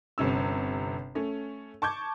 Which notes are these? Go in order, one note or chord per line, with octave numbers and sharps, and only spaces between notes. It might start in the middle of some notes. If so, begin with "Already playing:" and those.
G1 C3 C#4 E6
A3 C#4
A5 C#6 D6 G6 G#6